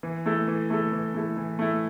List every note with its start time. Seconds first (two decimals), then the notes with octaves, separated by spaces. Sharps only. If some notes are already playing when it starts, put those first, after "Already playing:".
0.03 E3
0.26 A3 E4 A4
0.48 E3
0.70 A3 E4 A4
0.92 E3
1.14 A3 E4 A4
1.37 E3
1.59 A3 E4 A4